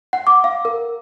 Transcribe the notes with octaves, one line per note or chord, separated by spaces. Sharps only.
F#5
D6
F5
A#4